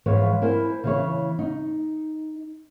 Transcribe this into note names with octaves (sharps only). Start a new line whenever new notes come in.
G#2 E3 F3 B4 C#5
E4 A#4 C5 G#5
C#3 E3 C#5
D#4